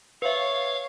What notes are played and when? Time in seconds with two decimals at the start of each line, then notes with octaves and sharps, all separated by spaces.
0.22 B4 C#5 E5 F5